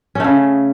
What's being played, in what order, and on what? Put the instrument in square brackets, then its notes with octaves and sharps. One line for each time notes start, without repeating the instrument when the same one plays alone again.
[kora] C#4
A3
C#3